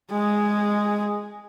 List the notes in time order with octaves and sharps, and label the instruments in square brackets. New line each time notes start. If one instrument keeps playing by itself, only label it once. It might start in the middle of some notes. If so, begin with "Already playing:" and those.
[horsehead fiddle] G#3 G#4